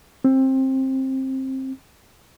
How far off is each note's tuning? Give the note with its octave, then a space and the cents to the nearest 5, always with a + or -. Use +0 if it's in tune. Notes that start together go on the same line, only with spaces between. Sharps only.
C4 +20